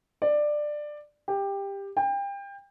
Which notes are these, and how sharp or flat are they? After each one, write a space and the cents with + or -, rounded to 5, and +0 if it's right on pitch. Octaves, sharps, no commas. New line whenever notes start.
D5 +15
G4 +15
G5 +30